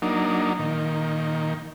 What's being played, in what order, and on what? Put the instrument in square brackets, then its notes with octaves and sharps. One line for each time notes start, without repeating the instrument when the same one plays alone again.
[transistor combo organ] F#3 A#3 D4 D#4
A#2 D#3